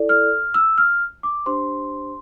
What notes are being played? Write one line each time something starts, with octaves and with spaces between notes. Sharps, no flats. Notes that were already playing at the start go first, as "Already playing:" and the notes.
Already playing: E4 A4 D5
F6
E6
F6
D6
D4 G4 C5 C6